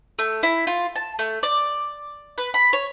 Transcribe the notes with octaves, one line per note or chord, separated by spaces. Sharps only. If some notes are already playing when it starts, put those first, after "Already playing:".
A3
E4
F4
A5
A3
D5
B4
B5
C#5